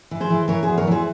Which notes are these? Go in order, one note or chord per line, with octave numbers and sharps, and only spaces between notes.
E3
G#4 C5
E3
E3 A#4 C#5
G#4 C5
E2
A#4 C#5
E3 G#4 C5